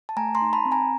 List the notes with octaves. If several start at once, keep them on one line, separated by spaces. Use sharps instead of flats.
A5
A3 G#5 A#5
A#5 C6
D#4
A5 B5
C4
G#5 A#5